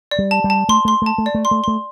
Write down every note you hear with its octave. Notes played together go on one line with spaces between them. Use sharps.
D5
G3
A5
G3
A5
A3 C6
A3 C6
A3
A5
A3
D5
A3
C6
A3
A3 C6